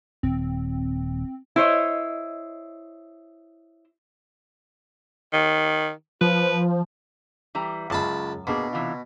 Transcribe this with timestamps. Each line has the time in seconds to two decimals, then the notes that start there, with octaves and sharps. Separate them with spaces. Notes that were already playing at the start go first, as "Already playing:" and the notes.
0.23 D#1 C4
1.56 E4 C5 C#5 D#5
5.33 D#3
6.21 F3 B4
7.55 E3 G3 A#5
7.90 C#2 F#2 A5 B5
8.47 B2 A#3 D4 G#4
8.73 C3 E3 F4